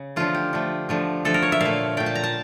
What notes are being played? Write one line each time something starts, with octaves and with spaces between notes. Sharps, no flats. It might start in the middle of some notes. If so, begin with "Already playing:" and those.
Already playing: C#3
D3 F3 A3 F4
G4
D3 F3 A3
D3 F3 A3
D3 F3 A3 A4
A#4
C#5
E5
A#2 A3 F5
A#2 A3 G5
A5
A#5
A5